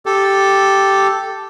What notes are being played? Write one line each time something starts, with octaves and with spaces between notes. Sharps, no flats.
G4 A4